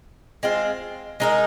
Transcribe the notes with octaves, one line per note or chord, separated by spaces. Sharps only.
G#3 C4 F4
G#3 D#4 A#4